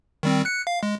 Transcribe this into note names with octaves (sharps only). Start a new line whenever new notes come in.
D#3 G3 C4
F#6 C#7
F5
G#3